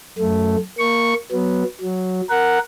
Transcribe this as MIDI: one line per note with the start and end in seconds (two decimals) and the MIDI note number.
0.18 0.56 42
0.18 0.56 57
0.78 1.14 58
0.78 1.14 85
1.32 1.64 54
1.32 1.64 59
1.81 2.21 54
2.30 2.59 70
2.30 2.59 78